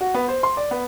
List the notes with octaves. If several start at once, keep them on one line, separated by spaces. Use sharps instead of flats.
F#4
B3
C5
C6
D5
B3